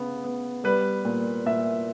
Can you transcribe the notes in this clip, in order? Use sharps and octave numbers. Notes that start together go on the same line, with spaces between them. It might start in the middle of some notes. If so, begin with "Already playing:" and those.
Already playing: C#3 B3
B3
G3 B4
A#2
A#2 E5